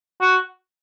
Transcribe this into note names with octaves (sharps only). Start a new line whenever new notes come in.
F#4